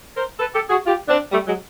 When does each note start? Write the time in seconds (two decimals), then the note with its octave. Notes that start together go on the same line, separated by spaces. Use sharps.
0.16 A#4 C5
0.39 A4 B4
0.54 G4 A4
0.70 F#4 G#4
0.85 F4 G4
1.08 C4 D4
1.31 G3 A3
1.47 F#3 G#3